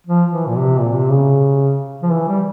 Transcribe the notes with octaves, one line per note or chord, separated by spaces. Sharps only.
F3
E3
A#2
C3
A#2
C3
C#3
F3
E3
G3